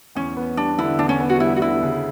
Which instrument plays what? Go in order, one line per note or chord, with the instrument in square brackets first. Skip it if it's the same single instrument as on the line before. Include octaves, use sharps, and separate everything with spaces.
[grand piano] E2 [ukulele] C#4
[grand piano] B3
[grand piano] G3 [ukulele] D4
[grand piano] D3 [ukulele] E4
[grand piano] E2 [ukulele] D4
[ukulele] C#4
[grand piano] B3
[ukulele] F#4
[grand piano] G3 [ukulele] E4
[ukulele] F#4
[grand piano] D3 [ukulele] E4
[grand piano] C#3